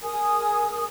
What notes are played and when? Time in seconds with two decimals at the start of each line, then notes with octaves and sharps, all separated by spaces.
0.02 G#4 A#4 G#5 D#6